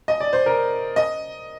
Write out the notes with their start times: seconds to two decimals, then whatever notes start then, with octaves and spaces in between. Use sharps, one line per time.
0.08 D#5
0.20 D5
0.33 C5
0.46 A#4
0.96 D#5